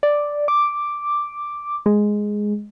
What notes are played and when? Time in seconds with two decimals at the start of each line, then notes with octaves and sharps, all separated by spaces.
0.03 D5
0.48 D6
1.86 G#3